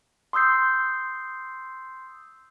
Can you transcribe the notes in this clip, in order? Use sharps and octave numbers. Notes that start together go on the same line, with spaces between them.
C6 D#6 E6 G6 C7